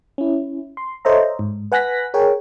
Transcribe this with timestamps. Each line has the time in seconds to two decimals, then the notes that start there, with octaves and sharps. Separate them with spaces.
0.18 C#4 E4
0.77 C6
1.05 A4 C5 C#5 D#5 E5 A#5
1.39 G#2
1.72 B4 F#5 G#5 F#6 A#6 B6
2.14 G#4 A#4 C#5 G5